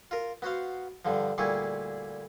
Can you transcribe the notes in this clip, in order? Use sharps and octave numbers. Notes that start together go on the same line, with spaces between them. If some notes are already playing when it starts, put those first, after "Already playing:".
F4 A#4
B3 F#4 C5 F5
G2 D3 F3
D2 A#2 G3 E4 G#4 C#6